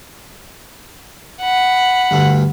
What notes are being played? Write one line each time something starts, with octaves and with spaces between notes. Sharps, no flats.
F#5 B5
D2 G2